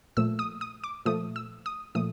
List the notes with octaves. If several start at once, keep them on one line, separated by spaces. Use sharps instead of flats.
A#2 F3 A3 E6
D#6
D#6
D6
A#2 F3 A3 D#6
E6
D#6
A#2 F3 A3 D#6